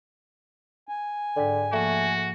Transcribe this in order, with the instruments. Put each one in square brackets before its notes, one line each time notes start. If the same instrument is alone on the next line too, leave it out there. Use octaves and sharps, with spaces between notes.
[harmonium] G#5
[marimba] G#2 G5 [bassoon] D3
[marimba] F3 A#3 [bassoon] A3 [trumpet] F#4